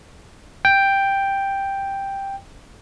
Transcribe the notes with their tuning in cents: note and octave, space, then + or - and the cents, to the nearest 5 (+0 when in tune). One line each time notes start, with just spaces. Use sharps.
G5 +5